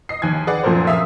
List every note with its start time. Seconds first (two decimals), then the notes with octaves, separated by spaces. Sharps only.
0.09 D#5 C7
0.22 D#2 G#5 G#6
0.47 G#4 B4 D5 F#5
0.64 F#2 A#2 F3 A4 A#4 C5
0.87 E5 F5 D#6 E6